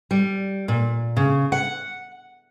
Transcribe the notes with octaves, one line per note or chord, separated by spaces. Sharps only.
G3
A#2
C#3
F#5